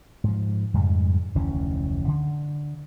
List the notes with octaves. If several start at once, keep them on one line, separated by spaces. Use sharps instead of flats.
G#2 F3
F2 G#2 C#3 G3
F1 D2 E3 C#4
D3